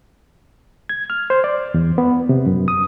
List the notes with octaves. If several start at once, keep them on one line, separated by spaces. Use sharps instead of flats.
G#6
F6
C5
D5
E2
B3
C3
F#2
D#6